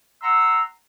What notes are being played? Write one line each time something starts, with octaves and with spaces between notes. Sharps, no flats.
F#5 A#5 C6 E6